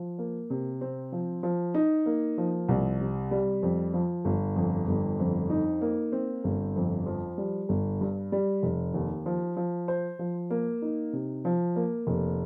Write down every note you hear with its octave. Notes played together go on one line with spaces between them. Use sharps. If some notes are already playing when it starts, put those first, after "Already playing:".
Already playing: F3
A#3
C3
C4
F3
F3
D#4
A#3
F3
C2
C3
G3
F2
F3
G1
F2
G1
F2
D#4
A#3
C4
G1
F2
F3
G3
G1
G2
G3
F1
D#2
F3
F3
C5
F3
A#3
D#4
C3
F3
A#3
F1